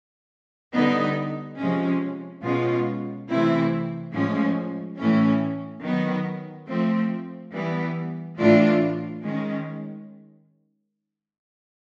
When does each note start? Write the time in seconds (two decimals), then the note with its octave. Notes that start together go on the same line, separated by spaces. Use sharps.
0.74 D3 G3 B3 D#4
1.59 C3 F3 G#3 C#4
2.43 B2 G#3 C#4 F4
3.29 C3 E3 A3 C4 E4
4.14 A2 F3 G#3 C#4
4.99 A2 E3 A3 C#4
5.83 D#3 F#3 B3
6.68 F3 A3 C4
7.53 E3 G3 B3
8.38 A2 E3 A3 D4 F4
9.23 D#3 G#3 C#4